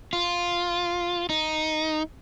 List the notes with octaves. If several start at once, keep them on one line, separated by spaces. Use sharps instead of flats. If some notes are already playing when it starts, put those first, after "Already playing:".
F4
D#4